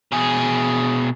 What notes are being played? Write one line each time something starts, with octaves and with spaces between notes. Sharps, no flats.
B2 G#4